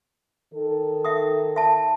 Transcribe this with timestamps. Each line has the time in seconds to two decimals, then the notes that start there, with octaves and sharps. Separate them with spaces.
0.54 D#3 A4
1.05 E5 D#6
1.56 E5 A5